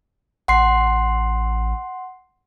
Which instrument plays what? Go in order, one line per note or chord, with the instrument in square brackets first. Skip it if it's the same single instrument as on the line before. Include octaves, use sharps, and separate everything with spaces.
[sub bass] A1 [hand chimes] F#5 C6 C7